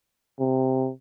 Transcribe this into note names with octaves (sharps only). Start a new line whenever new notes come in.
C3